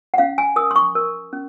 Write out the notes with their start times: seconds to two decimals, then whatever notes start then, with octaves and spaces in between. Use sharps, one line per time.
0.14 F#5
0.18 C#4 F5
0.38 G#5
0.56 A#4 D#6
0.71 C6
0.76 C#6
0.95 A#4
1.33 C#4